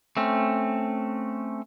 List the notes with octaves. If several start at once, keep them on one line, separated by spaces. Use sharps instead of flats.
A3 C4 C#4